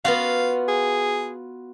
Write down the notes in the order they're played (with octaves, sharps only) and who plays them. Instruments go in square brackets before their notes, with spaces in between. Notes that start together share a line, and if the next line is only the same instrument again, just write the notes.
[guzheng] B3 F4 F#4 [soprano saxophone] F5
[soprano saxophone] G#4